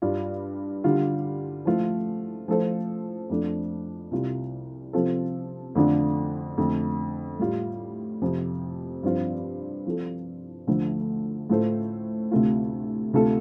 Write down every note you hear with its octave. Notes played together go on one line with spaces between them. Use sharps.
G2 G3 D4 F4
D3 G3 F4
F3 A3 F4
F3 A3 F4 A4 C5
F2 F3 A3 D4 A4
C2 C3 G3 F4
C3 F3 C4 F4 A4
F2 D3 A3 D4 F4
F2 D3 A3
A2 G3 F4
F2 C3 F3
G2 F3 C4 F4 C5
F3 C4 F4 A4
D2 D3 F3 A3
A2 A3 F4 A4 C5
D2 C3 A3 F4
D2 C3 A3 F4 A4